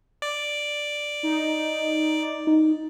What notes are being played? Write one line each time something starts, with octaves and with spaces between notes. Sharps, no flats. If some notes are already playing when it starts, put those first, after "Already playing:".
D5
D#4
D#4